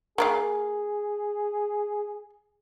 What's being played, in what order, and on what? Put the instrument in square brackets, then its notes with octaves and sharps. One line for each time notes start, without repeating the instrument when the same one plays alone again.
[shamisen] A#3 A#4 F5 [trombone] G#4